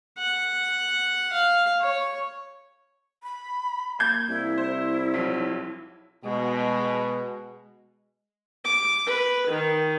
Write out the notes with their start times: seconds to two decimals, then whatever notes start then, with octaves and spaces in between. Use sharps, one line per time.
0.18 F#5
1.32 F5
1.81 C#5
3.23 B5
3.99 A#3 G6 G#6
4.29 C2 E4
4.57 C5
5.14 B1 F3
6.24 B2 G#3
8.65 D6
9.07 B4
9.48 D#3